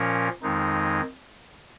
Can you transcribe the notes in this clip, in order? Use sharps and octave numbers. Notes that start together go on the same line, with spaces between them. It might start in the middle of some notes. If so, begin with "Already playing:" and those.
Already playing: A#2 F3 C#4 A#4
F2 D#3 G#3 D#4